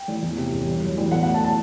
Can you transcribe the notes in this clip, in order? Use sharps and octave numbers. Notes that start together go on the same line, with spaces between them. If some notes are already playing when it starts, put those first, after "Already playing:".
Already playing: G5
A1
E2
C3
E1
G2
F#3
A1
B2 F#5
F#5
A3
A5
A5